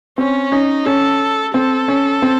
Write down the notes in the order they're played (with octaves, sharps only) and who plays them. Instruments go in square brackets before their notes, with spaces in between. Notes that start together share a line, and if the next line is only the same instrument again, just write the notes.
[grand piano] C4 [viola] C#4
[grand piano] C#4 [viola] D#4
[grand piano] C#4 [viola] A4
[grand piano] C4 [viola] A4
[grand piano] C#4
C4